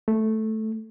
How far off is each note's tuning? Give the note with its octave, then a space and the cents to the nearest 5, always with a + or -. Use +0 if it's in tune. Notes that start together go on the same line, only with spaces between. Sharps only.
A3 -5